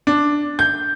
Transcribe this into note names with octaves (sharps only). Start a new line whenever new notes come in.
D4
G6